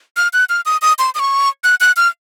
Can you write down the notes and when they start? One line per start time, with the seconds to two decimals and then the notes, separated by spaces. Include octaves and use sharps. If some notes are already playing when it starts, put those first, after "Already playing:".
0.17 F6
0.33 F#6
0.49 F6
0.66 D#6
0.82 D#6
0.99 C6
1.15 D#6
1.19 C#6
1.64 F#6
1.81 F#6
1.97 F6